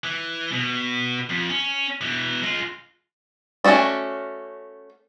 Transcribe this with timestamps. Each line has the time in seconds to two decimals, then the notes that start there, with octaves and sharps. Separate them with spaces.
0.04 E3
0.52 B2
1.29 F2
1.50 C#4
2.01 B2 E3
2.43 G#3 F4
3.64 A3 C#4 D#4 F#4 D5